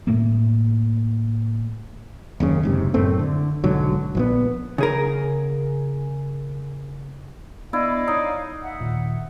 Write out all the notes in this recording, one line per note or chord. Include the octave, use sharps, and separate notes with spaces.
A2 A3 A#3
F#1 D#2 C#3
F#1 G#2 C3
F#2 A2 A3 C4
D3
B1 G#2 D3 F#3
A#1 E3 B3
C#3 G#4 A#4
B3 D4 E4 D5 D#5 F5
D#4 C#5
E5 F#5
D#2 A#2 D#3